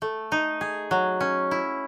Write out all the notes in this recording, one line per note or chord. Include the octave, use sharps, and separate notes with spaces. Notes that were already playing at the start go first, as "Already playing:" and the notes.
A3
D#4
G#4
F#3
C#4
E4